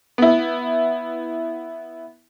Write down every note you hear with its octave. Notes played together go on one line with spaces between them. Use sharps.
B3 E4